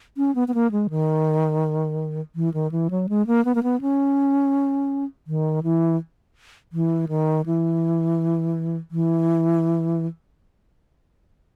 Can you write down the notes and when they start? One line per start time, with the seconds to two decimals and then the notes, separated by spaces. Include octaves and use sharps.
0.17 C#4
0.35 B3
0.48 B3
0.54 A#3
0.72 G#3
0.90 D#3
2.36 E3
2.54 D#3
2.72 E3
2.90 F#3
3.09 G#3
3.27 A#3
3.45 B3
3.55 A#3
3.63 B3
3.81 C#4
5.27 D#3
5.63 E3
6.73 E3
7.09 D#3
7.46 E3
8.91 E3